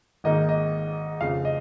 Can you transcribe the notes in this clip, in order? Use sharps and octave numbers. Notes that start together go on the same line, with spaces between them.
G#1 G#2 D#3 A#3 D#4 D#5
D#5
F1 F2 C#3 F5
D#5